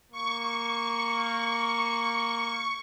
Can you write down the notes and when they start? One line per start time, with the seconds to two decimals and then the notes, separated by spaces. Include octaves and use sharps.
0.12 A#3 C#6